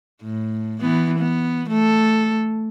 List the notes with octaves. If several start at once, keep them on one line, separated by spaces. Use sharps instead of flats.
A2
E3 B3
B3
A3 A4